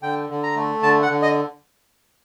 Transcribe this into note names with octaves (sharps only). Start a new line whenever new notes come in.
D3 G5
D3
A#5
A3
D3 A5
F#5
D3
D#5